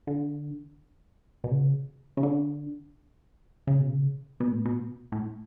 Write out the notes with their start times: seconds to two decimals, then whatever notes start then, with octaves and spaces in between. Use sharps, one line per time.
0.07 D3
1.44 B2
1.51 C#3
2.17 C#3
2.23 D3
3.67 C#3
3.81 B2
3.93 C#3
4.40 B2
4.52 A2
4.65 B2
5.12 A2